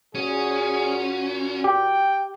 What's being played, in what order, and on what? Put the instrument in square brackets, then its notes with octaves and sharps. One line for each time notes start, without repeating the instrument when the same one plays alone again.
[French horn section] A#2 F#4 [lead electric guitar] C#4 [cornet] G#4
[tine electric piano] G4 [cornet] G5